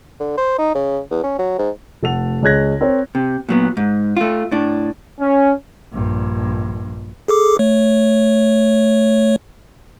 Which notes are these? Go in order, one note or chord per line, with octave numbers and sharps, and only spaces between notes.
D3
C5
D#4
C#3
E2
C#4
F#3
G#2
F1 A3 A4 F#5 F7
C#2 G#3 C#5 F#6 G#6 A#6
C4 A#4 C#5
C3
A#2 F#3 B3
G#2
A3 F4
A2 D4
C#4
A#1 G2
G#4 A4 D6
A3 C#5